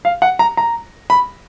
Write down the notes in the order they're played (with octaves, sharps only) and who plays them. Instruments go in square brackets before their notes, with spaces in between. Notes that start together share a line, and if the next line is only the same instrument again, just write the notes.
[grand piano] F5
F#5
A#5
A#5
B5